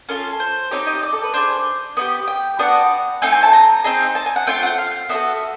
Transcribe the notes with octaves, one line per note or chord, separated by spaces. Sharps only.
C#4 F4 A4 A#4
C5
C4 D#4 G4 C#5
D#5
D5
A4
B4
D4 F4 G#4 C5
B3 D#4 G4
G5
B3 D4 F#4 F#5
A3 C4 D#4 G#5
G#5
A5
A#5
C4 D#4 G#4
A5
G#5
F#5
A3 C4 F4 G5
F#5
F5
B3 D#4 F#4 A4 E5